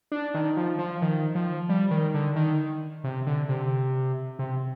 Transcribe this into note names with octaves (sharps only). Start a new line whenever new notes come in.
D4
D#3
F3
F3
D#3
F3
G3
D#3
D3
D#3
C3
D3
C3
C3